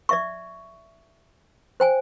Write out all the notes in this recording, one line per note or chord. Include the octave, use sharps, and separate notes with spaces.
D5 E5 C#6
C5 G5 G#5